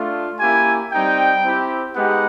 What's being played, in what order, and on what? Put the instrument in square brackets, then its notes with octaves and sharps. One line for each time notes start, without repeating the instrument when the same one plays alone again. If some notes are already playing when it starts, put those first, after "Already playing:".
Already playing: [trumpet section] A3 D4 F4
A#3 C#4 E4 G4 G#5
G3 C4 D#4 G5
C4 E4 G4
G#3 B3 D#4 G4 F#5